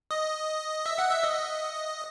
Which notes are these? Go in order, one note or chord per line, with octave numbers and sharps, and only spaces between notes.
D#5
E5
F#5
E5
D#5